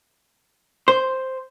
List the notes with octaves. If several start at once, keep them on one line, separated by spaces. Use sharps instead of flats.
C5